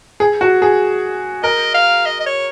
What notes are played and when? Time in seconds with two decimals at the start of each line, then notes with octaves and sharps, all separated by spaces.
0.20 G#4
0.41 F#4
0.62 G#4
1.43 A#4 D#5
1.74 F5
2.06 D#5
2.20 D#5
2.26 C#5